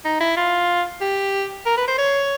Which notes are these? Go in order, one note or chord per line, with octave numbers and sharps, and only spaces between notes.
D#4
E4
F4
G4
A#4
B4
C5
C#5